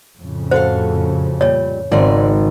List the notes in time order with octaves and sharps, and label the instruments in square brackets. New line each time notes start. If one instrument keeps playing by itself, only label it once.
[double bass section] F2 A2 C#3
[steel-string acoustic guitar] F#4 A4 F5 [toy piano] C5
[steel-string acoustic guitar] A#2 G3 [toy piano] C#5
[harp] G#1 [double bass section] C#3 G#3 [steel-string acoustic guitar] C4 D5